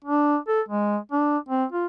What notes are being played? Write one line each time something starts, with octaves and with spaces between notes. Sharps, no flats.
D4
A4
G#3
D4
C4
F4